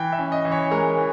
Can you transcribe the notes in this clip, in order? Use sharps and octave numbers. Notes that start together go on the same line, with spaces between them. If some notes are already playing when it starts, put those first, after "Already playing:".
Already playing: E3 G5
E5
C#4
D#5
E3
C#5
G#3 A#4
E3